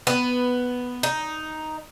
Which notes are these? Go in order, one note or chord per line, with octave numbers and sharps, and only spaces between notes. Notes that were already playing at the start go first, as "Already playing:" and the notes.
B3
D#4